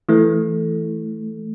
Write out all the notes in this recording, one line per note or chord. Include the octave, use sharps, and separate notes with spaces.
E3 A3